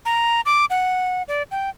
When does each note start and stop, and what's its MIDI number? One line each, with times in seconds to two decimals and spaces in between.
0.05 0.41 82
0.46 0.65 86
0.70 1.23 78
1.28 1.43 74
1.51 1.70 79